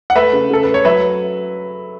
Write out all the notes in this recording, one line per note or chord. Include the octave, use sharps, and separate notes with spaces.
F#5
A3 B4 E5
C#3
C#3 A4
A3 B4
C#5
F#3 B4 E5